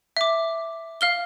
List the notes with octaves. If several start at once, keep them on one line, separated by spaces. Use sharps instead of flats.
E5 D6
F5 F6 G7